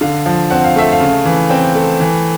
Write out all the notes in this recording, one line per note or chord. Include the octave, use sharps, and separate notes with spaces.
D3 F5
F3
C4 F#5
F5
A3 E5
F5
C#3
E3
C4 G5
A3
E3